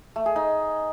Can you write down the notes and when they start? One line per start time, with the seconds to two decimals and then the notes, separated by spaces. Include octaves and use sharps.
0.16 A3
0.26 G#4
0.36 D#4